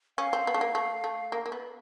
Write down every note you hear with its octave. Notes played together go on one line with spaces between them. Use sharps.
C#4 F5
C4
B3
A3
A#3
A3
A3
A#3
A#3
B3